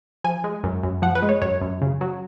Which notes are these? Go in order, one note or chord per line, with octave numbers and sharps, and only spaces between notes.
F3 G#5
G#3
F#2
F#2
F3 F#5
B4
G#3
C#5
F#2 C#5
F#2
C#3
F#3